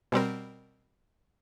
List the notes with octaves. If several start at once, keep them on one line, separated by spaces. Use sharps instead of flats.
B2 G3 C4 A#4